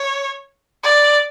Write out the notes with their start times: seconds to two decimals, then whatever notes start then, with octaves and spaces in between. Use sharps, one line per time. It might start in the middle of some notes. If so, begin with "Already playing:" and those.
Already playing: C#5
0.84 D5